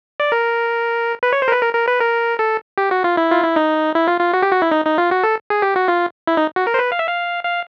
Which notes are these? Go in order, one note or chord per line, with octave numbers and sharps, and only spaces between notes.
D5
A#4
B4
C#5
C5
A#4
B4
A#4
A#4
B4
A#4
A4
G4
F#4
F4
E4
F4
E4
D#4
E4
F4
F4
F#4
G4
F#4
E4
D#4
D#4
F4
F#4
A4
G#4
G4
F#4
F4
E4
D#4
F#4
A#4
C5
B4
F5
E5
F5
F5